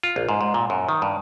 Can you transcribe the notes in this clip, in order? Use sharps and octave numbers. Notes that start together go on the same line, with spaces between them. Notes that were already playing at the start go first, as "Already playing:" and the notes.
F4
A#1
G#2
G#2
A#2
F#2
D#3
G2